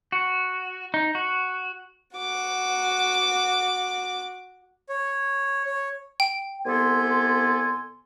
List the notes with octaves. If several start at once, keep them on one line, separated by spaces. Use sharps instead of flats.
F#4
D#4
F#4
F#4 D6
C#5
C#5
G5
C2 B3 A4 D5 G#5 C6